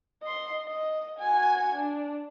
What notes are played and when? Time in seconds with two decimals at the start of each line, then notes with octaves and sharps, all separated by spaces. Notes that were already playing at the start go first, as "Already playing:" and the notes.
0.23 D#5 C6
0.66 D#5
1.19 F#4 G#5
1.75 D4